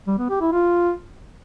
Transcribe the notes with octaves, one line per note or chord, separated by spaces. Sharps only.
G3
B3
G4
E4
F4